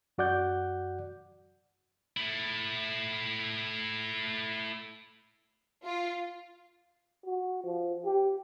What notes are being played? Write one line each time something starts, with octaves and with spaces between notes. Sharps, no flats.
F#2 F#4 D5 F#5 G6
A3 E4
F4
F#4
F3
G4